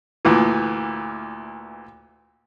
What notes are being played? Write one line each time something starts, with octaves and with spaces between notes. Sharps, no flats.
D2 A#2 E3